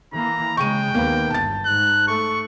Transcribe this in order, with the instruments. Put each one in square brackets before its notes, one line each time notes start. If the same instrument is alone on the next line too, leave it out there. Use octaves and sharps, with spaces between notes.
[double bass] E3 A#3 [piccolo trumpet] A#5
[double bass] C#3 G#3 [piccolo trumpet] G5 [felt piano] C#6 D#7
[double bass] D#2 [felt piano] A#3 B3
[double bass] G1 [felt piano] A5 A6
[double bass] G#2 [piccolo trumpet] F#6
[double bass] A3 [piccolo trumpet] C#6